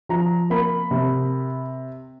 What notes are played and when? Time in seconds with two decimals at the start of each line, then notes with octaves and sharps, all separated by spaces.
0.09 F3 A#5
0.50 A#3 B5
0.91 C3